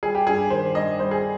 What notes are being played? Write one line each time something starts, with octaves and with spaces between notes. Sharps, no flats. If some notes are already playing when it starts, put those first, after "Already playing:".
G3 G#4
G4
G2 G#4
D#3 C5
G2 D#5
G3 C5
G#4